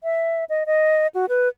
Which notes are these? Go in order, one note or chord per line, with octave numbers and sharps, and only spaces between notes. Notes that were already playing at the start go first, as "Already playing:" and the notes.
E5
D#5
D#5
F#4
B4